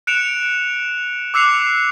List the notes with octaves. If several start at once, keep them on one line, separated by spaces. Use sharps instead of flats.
F#6 C#7 D7 E7 F7
D6 E6 F#6 C7 C#7 F7